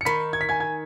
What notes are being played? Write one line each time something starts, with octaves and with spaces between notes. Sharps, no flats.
C#7
D#3 B5 B6
G#6
B6
G#5 G#6
G#5 G#6